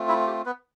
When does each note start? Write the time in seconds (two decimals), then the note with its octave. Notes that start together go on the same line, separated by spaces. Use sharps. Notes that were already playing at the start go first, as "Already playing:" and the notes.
Already playing: A3 C4 F4
0.08 E4 E5
0.27 G4
0.46 B3 B4